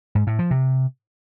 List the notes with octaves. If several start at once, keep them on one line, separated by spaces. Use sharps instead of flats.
G#2
A2
F3
C3